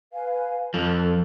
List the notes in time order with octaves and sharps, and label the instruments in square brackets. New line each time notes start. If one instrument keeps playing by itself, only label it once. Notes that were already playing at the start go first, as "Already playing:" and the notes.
[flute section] B4 F5 G#5
[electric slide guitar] F2 F3 [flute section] A4